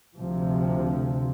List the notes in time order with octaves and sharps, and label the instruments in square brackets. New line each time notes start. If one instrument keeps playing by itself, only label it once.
[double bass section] D2 C3 F3